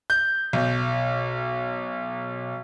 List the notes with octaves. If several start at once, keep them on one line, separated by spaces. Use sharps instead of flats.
G6
B1